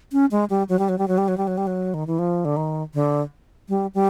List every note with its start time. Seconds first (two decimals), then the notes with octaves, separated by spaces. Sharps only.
0.12 C#4
0.31 G#3
0.50 G3
0.69 F#3
0.79 G3
0.89 F#3
0.98 G3
1.08 F#3
1.18 G3
1.28 F#3
1.37 G3
1.47 F#3
1.58 G3
1.67 F#3
1.94 D#3
2.07 E3
2.19 F3
2.45 D3
2.57 D#3
2.94 D3
3.69 G3
3.94 G3